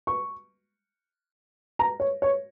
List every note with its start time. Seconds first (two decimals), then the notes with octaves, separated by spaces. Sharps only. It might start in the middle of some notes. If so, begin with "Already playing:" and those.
0.07 C#6
1.79 A#5
2.00 C#5
2.22 C#5